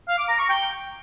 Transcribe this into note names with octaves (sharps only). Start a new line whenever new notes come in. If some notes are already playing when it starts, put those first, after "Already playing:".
F5
D6
A#5
C#6
G5